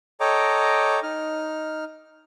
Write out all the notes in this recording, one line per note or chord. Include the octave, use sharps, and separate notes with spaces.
A4 C#5 D#5 G5 A#5 D6
D#4 F6